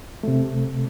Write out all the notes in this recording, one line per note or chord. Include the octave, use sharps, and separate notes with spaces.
C3 A3